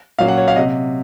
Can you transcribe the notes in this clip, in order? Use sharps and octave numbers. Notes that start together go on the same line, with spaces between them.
A#2 F#3 A#3 C#4 F5
F#5
C#5
F5
C3 D#5